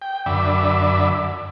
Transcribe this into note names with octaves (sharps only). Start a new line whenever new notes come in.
G5
F#2 D3 D5 E5 B5